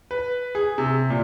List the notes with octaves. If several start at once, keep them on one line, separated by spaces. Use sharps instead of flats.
B4
G#4
C3
A#2